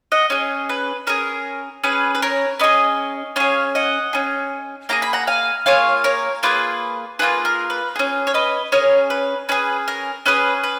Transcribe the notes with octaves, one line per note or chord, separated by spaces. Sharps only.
D#5 F#5
C#4 G#4
B4
C#4 G#4 A#4
C#4 G#4 B4
B4
A#4 C#5
C#4 G#4 B4 D#5
C#4 G#4 C#5 F5
D#5 F#5
C#4 G#4
A#3 F4 G#4 A#5
B5
F#5 A#5
F5 G#5
A#3 F4 G#4 C#5 F5
A#4 C#5
A#3 F4 G#4 B4
A#3 F4 G#4 B4
A#4
B4
C#4 G#4
C#5
B4 D#5
C#4 G#4 A#4 C#5
B4
C#4 G#4 B4
A#4
C#4 G#4 B4
B4